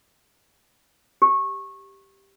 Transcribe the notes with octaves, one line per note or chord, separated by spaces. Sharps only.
G4